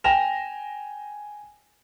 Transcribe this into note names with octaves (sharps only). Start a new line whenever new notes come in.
G5 G#5 A#6 E7 F7